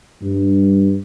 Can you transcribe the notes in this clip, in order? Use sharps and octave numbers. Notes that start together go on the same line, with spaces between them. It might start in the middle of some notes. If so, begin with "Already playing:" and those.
G2